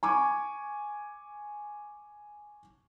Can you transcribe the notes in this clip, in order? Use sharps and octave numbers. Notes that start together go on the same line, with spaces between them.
G#5 C#6 D6